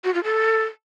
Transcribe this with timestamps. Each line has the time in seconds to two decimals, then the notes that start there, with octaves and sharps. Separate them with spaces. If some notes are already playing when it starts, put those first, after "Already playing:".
0.04 F#4
0.14 F4
0.24 A4